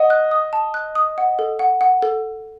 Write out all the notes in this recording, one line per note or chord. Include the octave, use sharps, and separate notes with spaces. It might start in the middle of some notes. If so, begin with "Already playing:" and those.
Already playing: D#5 F#5
F#6
D#6
A5
F#6
D#6
F#5
A4
F#5
F#5
A4